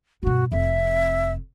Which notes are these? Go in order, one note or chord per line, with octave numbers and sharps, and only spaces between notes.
G2 B2 F#4
F1 F2 E5